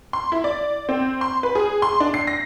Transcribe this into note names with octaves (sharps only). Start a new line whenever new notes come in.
C6
E4
D5
C4
C6
B4
G#4
C6
D4
C7
A#6